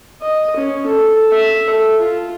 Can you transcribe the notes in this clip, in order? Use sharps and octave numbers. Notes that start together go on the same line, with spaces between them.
D#5
C#4
A4
E5
A4
F4